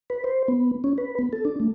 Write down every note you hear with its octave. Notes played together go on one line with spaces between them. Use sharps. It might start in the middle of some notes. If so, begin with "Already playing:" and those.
B4
C5
B3
C#4
B4
B3
A4
D4
A3